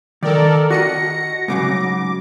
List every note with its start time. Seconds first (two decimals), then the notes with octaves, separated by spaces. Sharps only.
0.23 D#3 A4 A#4 D5
0.70 F#4 D#5 F#5 A#6 C#7
1.48 G#2 C#3 F#3 D6